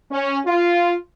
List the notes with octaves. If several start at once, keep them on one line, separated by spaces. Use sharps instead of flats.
C#4
F4